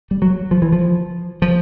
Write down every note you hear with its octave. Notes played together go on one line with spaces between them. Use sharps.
G3
F#3
F3
E3
F3
F3